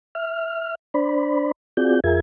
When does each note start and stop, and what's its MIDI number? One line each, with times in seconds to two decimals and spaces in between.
0.15 0.75 76
0.15 0.75 89
0.94 1.51 62
0.94 1.51 72
0.94 1.51 74
0.94 1.51 83
1.77 2.00 60
1.77 2.00 65
1.77 2.00 66
1.77 2.00 68
1.77 2.00 74
1.77 2.00 91
2.04 2.20 41
2.04 2.20 65
2.04 2.20 68
2.04 2.20 70
2.04 2.20 76
2.04 2.20 92